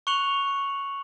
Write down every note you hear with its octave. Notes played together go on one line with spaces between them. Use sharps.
C#6 F#6 C#7 F7 F#7